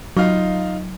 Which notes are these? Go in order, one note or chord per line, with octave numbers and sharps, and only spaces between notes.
F#3 D#4 F4 F5